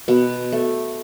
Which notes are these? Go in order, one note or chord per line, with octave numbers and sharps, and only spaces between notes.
B2 B3
A3